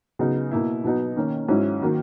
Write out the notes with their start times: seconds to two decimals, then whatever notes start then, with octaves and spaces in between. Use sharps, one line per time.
0.19 C#3 F#3 B3 D#4
0.51 B2 A#3 E4
0.84 B2 F#3 B3 D#4
1.17 D#3 A#3 C#4
1.49 G#2 F#3 C#4 E4
1.82 D#3 F#3 A#3